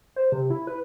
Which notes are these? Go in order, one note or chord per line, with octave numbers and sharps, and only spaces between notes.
C5
C3
E4
B4